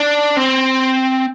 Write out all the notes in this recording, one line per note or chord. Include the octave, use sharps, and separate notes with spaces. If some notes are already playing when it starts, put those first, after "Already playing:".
Already playing: D4
C4